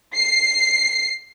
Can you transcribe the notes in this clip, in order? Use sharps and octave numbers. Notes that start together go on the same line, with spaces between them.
C7